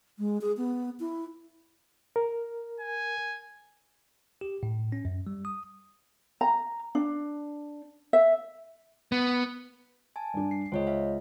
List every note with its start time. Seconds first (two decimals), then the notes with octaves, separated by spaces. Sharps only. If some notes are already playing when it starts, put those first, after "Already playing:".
0.19 G#3
0.41 G#4
0.57 B3
1.00 E4
2.16 A#4
2.80 G#5
4.41 G4
4.63 A2
4.92 C#4
5.05 F#2
5.27 G3
5.45 D#6
6.41 A#5
6.95 D4
8.13 E5
9.12 B3
10.16 G#5 A5
10.34 G2 D4
10.51 C7
10.72 C#2 C5 C#5 D#5
10.87 E5 F5